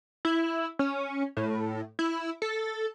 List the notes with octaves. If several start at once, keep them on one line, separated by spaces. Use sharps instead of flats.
E4
C#4
A2
E4
A4